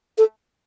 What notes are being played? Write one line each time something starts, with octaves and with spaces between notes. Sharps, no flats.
A4